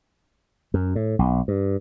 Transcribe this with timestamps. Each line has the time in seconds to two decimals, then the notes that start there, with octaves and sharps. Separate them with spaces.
0.74 F#2
0.96 A2
1.19 B1
1.48 G2